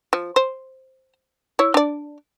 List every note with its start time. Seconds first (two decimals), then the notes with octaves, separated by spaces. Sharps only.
0.13 F3
0.36 C5
1.59 E4 C#5
1.74 D4 D5